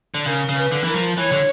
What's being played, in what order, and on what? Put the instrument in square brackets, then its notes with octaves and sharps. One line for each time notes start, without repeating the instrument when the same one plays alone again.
[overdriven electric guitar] D3
[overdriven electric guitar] C#3 [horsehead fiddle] A#4
[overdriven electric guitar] C#3
[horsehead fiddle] B4
[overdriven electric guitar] D3
[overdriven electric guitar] E3 [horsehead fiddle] A#4
[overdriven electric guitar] F3
[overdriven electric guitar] E3 [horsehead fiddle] C#5
[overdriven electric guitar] D3